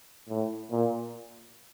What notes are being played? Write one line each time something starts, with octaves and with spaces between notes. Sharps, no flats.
A2
A#2